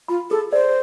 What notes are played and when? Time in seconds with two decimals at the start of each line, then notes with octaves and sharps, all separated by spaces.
0.08 F4 B5
0.30 G#4 A4
0.53 C5 D5